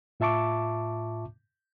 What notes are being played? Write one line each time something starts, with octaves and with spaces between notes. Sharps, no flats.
A2 F4 E5 A5 C#6 D6